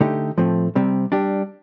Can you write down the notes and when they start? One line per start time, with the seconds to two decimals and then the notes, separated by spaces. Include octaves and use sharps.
0.01 D3 A3 D#4 G4
0.38 A2 F3 A3 C4
0.75 C3 G3 C4
1.12 G3 D4 G4